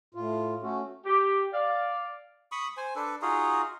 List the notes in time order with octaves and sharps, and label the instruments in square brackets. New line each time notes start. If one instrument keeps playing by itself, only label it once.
[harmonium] A2 F4
A3 C#4 F#4
[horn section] G4
D5 F5
[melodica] B5 C#6 D#6
C5 G#5
D4 A4 B4
D#4 F4 F#4 G#4